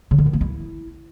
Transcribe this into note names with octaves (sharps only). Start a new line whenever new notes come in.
C#3
D3
D#3
A#3
E4